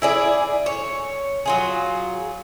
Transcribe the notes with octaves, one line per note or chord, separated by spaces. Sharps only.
E4 G#4 D5
C#5
F#3 F4 G#4